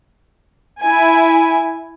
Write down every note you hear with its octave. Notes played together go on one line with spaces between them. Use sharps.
E4 G#5